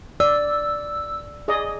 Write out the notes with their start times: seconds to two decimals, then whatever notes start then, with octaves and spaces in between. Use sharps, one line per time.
0.20 D5 E6
1.48 G#4 D5 D#5